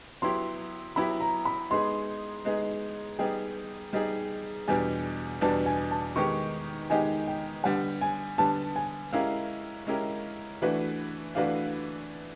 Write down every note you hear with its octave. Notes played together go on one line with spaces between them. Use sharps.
F#3 B3 E4 G4 C6
F#3 B3 E4 G4 B5
A#5
B5
G#3 B3 D#4 G#4 C6
G#3 B3 D#4 G#4
G3 B3 D#4 G#4 G5
G3 B3 D#4 G#4
E2 B2 G3 B3 D4 G#5
E2 B2 G3 B3 D4 A5
G#5
A5
D#3 G#3 B3 D#4 G4 C#6
D#3 G#3 B3 D#4 G4 G#5
G5
D3 G3 B3 F#5
G#5
D3 G3 B3 A5
G#5
G#3 C#4 E4 G4 A#4 F5
G#3 C#4 E4 G4 A#4
E3 A3 D4 F#4 B4
E3 A3 D4 F#4 B4 F5